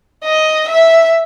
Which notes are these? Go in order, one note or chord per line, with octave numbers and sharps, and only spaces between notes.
D#5
E5